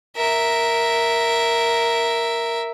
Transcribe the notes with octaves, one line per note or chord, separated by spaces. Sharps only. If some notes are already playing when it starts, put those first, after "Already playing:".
A#4 E5